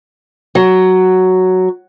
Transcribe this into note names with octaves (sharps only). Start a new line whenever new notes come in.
F#3